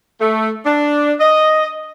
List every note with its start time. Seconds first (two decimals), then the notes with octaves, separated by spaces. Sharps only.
0.20 A3
0.65 D4
1.18 D#5